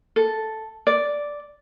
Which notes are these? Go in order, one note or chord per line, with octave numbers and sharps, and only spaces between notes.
A4
D5